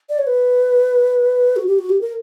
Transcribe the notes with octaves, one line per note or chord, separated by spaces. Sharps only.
D5
C#5
B4
F#4
G4
F#4
G4
A#4